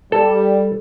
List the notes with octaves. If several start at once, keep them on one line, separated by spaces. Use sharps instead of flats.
G3 A4